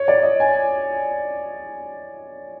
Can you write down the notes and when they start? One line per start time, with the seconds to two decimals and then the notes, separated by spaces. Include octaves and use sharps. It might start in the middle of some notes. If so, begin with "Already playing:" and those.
Already playing: C#5
0.08 D5
0.23 D#5
0.40 G#5